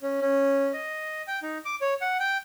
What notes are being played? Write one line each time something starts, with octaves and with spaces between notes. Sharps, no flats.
C#4
C#4
D#5
G5
D#4
D6
C#5
F#5
G5